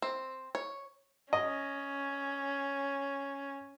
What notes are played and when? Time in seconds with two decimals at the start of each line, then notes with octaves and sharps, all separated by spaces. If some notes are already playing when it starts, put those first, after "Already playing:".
0.02 C4
0.55 C#5
1.33 C#4 D#5